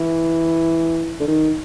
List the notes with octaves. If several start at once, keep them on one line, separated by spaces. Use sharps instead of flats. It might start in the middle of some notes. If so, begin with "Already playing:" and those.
Already playing: E3
D3
D#3